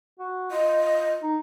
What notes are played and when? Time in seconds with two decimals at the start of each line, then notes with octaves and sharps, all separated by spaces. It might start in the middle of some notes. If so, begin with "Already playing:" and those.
0.19 F#4
0.51 F4 D#5
1.23 D#4